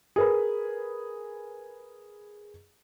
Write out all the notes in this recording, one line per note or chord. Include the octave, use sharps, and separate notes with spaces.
G#4 A#4 B4